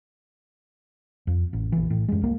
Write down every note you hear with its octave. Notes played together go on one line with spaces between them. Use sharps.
F2
A1
A#1 E3
A2
F#2 G#3
C2 A#3